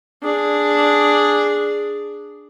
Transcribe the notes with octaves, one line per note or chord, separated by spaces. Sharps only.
D4 G#4